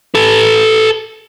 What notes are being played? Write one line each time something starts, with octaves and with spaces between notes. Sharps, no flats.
A4 B4